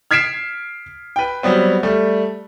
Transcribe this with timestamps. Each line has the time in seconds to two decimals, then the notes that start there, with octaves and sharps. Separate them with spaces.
0.11 F6 G#6 B6 C7 D7 E7
1.16 B4 G5
1.43 F#3 G3 B3 C4
1.83 G3 A3